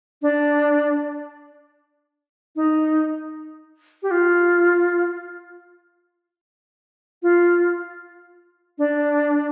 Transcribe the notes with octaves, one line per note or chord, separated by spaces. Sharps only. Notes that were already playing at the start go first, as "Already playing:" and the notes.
D4
D#4
G4
F4
F4
D4